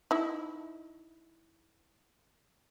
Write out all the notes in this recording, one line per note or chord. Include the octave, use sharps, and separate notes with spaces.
D#4 E4